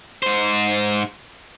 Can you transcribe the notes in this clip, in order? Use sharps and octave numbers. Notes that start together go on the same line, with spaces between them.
G#2 C5